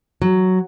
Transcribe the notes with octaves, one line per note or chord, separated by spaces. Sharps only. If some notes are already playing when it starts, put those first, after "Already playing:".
F#3